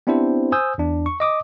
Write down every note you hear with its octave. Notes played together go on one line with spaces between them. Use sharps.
B3 C4 D4 E4 G4 C5
C5 G#5 D#6 E6 G6
E2 D4
C#6
D#5 D6 D#6